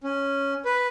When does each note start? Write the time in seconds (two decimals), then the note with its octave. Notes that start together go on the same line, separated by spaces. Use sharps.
0.04 C#4
0.65 B4